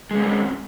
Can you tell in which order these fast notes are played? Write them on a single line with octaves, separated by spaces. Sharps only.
G#3 C#4 C4